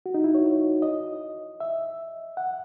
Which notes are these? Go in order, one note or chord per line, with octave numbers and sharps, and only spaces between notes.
F#4
D#4
E4
C#5
D#5
E5
F#5